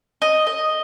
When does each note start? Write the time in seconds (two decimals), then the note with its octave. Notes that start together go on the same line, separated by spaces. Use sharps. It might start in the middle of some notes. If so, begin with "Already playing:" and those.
0.22 D#5
0.47 D#5